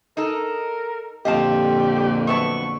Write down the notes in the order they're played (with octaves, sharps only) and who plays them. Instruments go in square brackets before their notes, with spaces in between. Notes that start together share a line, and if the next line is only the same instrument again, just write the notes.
[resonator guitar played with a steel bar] D#4 A4 [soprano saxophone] A#4
[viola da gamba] F2 A#2 D3 [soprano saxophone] G4 [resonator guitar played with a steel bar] D#5 F5 A5
[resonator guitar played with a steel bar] F#2 B3 A5 [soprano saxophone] C#6